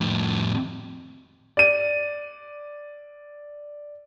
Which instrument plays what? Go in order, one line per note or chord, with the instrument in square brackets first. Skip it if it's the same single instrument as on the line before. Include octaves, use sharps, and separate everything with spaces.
[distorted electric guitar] F2 A2
[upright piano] D5 D#7